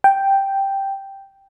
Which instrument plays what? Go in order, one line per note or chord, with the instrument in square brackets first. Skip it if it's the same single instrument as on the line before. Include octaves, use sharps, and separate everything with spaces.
[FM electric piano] G5